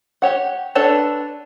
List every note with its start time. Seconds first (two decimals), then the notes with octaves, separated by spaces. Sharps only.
0.22 G4 C#5 F#5
0.75 D4 A4 B4 C#5 A5